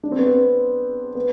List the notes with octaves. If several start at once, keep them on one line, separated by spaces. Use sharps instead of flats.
D4
C4
B3
C4
B3